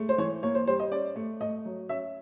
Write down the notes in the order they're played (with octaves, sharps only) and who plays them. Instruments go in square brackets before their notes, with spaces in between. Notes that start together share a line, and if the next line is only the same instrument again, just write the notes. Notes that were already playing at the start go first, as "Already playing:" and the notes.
Already playing: [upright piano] G#3 A3
C5
E3 C#5
A#3 C#5
C5
G3 C5
D#5
C#4 D5
A3
A3 D#5
F#3
C#4 E5